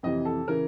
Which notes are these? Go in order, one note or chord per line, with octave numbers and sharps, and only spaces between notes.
F2 C3 E3 D#5
A4
C#3 E3 A#4